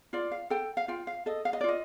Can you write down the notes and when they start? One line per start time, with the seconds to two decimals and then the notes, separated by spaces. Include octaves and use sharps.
0.13 F4 D5
0.31 F5
0.50 A4 G5
0.77 F5
0.88 F4 G5
1.07 F5
1.26 A4 D#5
1.45 F5
1.53 D#5
1.61 D5
1.64 F4 D#5